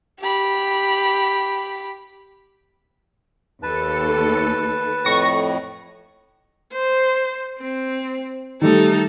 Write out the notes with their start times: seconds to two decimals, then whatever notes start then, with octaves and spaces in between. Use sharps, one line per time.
0.20 G4 B5
3.63 D#2 A4 B4 A5
5.04 F2 A2 C#6 A#6
6.73 C5
7.59 C4
8.62 D#3 G3 A3 D#4 A4